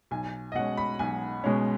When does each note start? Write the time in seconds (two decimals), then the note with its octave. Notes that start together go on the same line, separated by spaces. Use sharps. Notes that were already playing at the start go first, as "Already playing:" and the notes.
0.11 B1 G#5
0.52 D#5
0.55 B2 G#3 C#4 F#5
0.77 B5
0.99 B1 G#5
1.44 B2 G#3 C#4